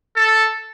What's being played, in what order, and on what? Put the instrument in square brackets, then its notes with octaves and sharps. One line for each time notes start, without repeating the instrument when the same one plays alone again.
[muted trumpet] A4